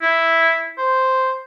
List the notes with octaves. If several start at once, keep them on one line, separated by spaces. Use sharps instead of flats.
E4
C5